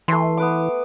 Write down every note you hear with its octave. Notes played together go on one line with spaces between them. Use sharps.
E3 A3 C6
B3 B4 D6